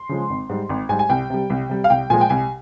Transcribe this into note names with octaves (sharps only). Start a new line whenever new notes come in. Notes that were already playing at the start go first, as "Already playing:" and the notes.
Already playing: C6
C#3 F3 G#3
G#1
G#2 G3
G#1
G#2 G3 G#5
G#5
C2 G5
C3 G3
C2
C3 G3
F5
C2 G5
A#2 F3 G#3 G#5
G5
C2 G#5